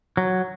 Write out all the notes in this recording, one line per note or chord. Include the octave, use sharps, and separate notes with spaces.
F#3